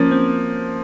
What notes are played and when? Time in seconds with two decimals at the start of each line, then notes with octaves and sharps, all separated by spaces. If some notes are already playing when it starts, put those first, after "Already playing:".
Already playing: F3 A#3 C#4
0.11 C4